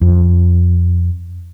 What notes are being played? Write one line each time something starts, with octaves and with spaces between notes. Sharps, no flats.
F2